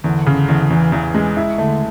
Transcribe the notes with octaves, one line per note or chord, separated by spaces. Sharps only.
E2 D3
C#3
E2
E2 E3
E2
G#3
E4
D3 A3